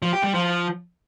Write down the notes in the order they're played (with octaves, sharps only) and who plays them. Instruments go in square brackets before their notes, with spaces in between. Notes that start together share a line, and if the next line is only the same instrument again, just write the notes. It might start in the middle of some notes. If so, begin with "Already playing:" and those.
[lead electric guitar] F3
G4
G3
F3